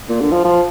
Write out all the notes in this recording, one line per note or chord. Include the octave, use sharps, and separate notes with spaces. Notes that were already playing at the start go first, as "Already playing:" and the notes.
A#2
D3
F3
F3